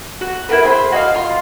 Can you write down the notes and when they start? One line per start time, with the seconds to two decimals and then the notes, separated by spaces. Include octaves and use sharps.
0.21 F#4
0.49 E4 F#4 A#4 B4
0.62 G#4 C5 E5 B5
0.92 F#4 D#5 F5
1.14 F4 C6